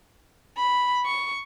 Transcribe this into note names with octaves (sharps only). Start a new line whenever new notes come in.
B5
C#6